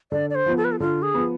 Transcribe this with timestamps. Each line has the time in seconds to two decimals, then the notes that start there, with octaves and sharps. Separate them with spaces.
0.12 D3 D5
0.30 D5
0.35 C5
0.46 F3 B3
0.57 A4
0.65 B4
0.72 A4
0.80 D3 F4
1.02 G#4
1.14 F3 B3